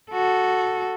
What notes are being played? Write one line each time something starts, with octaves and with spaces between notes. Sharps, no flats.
F#4 A4